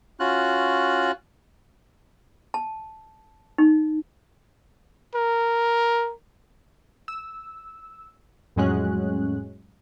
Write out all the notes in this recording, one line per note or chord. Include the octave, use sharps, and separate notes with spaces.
C#4 F4 F#4 F#6
A5
D#4
A#4
E6
F2 A2 F#3 G#3 C#4 F#6